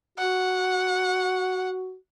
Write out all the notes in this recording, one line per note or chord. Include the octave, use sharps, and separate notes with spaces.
F#4 F#5